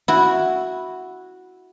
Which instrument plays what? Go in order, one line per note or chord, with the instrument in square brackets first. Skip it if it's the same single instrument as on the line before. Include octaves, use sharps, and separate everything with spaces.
[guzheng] E4 F#4